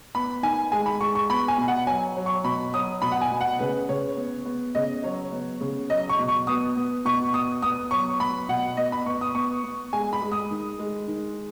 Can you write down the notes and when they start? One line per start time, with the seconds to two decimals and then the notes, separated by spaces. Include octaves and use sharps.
0.15 B3 B5
0.43 D#3 G#5
0.72 G#3 G#5
0.86 B5
1.00 G#3 C#6
1.15 C#6
1.30 B3 B5
1.48 G#5
1.58 B2
1.68 F#5
1.87 F#3 G#5
2.16 F#3
2.26 C#6
2.44 B2 B5
2.74 F#3 D#6
3.02 B2 B5
3.12 F#5
3.21 G#5
3.31 B2
3.41 F#5
3.59 C#3 B4
3.89 C#3 C#5
4.17 B3
4.46 B3
4.75 C#3 D#5
5.03 F#3 C#5
5.32 B3
5.61 C#3
5.89 F#3 D#5
6.09 C#6
6.19 B2
6.28 C#6
6.47 B3 D#6
6.77 B3
7.05 B2 C#6
7.33 B3 D#6
7.62 B3 D#6
7.91 F#3 C#6
8.20 B3 B5
8.49 B2 F#5
8.77 B3 D#5
8.92 B5
9.06 B3 C#6
9.21 D#6
9.35 B3 C#6
9.64 B3
9.93 G#3 G#5
10.13 B5
10.22 G#3
10.32 D#6
10.51 D#3
10.79 G#3
11.08 D#3